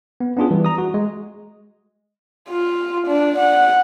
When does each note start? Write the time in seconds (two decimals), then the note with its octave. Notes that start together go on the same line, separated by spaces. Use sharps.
0.20 B3
0.36 B3 C#4 D4 F4 G#4
0.51 E3 G3
0.65 A#5 D#6
0.78 F#4
0.94 G#3
2.50 F4
3.07 D4
3.39 F#5